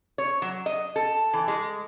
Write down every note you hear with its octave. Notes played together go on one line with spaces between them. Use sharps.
C#5
F#3
D#5
A4
E3
G#3